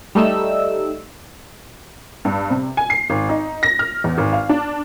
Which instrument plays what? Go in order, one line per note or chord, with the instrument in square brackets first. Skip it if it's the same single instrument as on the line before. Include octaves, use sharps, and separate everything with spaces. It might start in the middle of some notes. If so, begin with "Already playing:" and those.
[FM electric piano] G3 A3 D#4 E6
[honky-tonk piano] G2
C3
G#5
C7
G#1
D#4
A#6
F6
E2
G#1
F5
D4